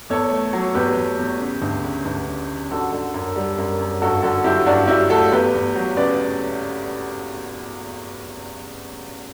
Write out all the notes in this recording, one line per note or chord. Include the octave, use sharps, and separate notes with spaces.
E2 A4 C#5
A3
F#3
E2 G4 B4
E2
E2
C#3
D2
C#3
D2
C#3
C#3
D3 F#4 A4
D3
F#2
G3
F#2
F#2
G2 F#4 A4
D3 F#4 A4
F#3 E4 G4
G2 D4 F#4
F#3 E4 G4
A3 F#4 A4
E2 G4 B4
E2
F#3
C#3 B4 D5